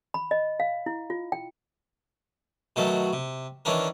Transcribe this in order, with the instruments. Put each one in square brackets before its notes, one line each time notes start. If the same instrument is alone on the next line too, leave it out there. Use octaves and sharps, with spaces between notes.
[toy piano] B5
D#5
F5
E4
F4
G5
[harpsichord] B2 D#3 F#3 A3
C3
D#3 E3 C#4 D4 A#4